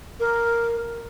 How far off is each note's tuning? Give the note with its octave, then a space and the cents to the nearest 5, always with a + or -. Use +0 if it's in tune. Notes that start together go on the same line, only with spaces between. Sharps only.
A#4 +0